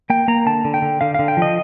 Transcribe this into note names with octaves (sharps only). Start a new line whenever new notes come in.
A#3 G5
A#3 A#5
D3 A5
D3
G5
D3
D3 F5
D3 F5
G5
F3 D#5